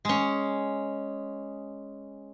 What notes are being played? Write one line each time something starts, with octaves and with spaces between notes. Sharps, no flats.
G#3 C#4